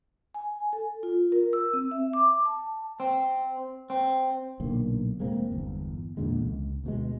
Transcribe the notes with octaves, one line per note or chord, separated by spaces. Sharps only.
G#5
A4
F4
A#4
E6
C4
E5
D6
A5
C4
C4
B1 A#2 D3 A#3
F1 G#3 A#3 C4
G1 E2
E2 A#2 D3 G#3
C#2
D2 B2 G#3